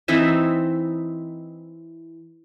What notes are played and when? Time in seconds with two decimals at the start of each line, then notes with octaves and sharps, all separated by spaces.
0.08 E3 C4 D#4 E5